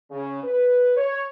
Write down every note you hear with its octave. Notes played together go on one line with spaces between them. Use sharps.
C#3
B4
C#5